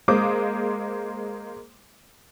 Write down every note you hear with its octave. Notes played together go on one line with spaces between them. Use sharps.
G#3 A#3 C5 D6 D#6